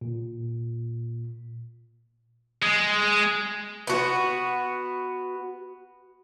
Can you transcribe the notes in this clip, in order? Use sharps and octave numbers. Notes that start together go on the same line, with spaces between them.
A#2
G#3
B3 F#4